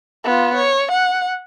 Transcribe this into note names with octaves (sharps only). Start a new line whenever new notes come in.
B3 F4
C#5
F#5